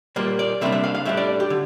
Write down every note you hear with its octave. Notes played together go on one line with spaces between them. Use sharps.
A#2 G3 A#3
D5
C3 G3 A#3 D4 E5
E5
F5
F5
A2 G3 D4 E5
D5
G4
D3